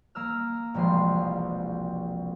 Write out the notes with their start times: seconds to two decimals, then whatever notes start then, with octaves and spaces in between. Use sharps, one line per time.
0.15 A#3 A#5 E6 F6
0.74 E1 C2 F3 G#3 C6